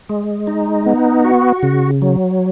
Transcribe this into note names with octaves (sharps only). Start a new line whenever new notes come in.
G#3
D#4
B3
F#4
C#3
F#3